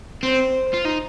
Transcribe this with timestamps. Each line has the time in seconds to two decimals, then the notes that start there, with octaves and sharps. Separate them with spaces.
0.23 C4 C5
0.74 F4
0.85 D#4